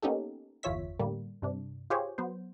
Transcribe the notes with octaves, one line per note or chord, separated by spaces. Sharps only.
A#3 B3 C#4 D#4 G4 A4
G1 E2 F4 C#5 E5 B6
A2 D3 G3 A#3
G2 C3 D4
F4 G4 G#4 C5 C#5
F#3 B3 C5